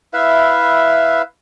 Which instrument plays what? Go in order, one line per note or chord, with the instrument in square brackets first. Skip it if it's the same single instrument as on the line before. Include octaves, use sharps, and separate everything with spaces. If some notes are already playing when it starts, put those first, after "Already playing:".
[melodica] E4 B4 E5 F5